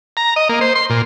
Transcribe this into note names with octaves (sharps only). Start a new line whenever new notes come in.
A#5
D#5
A#3
C5
C6
A#2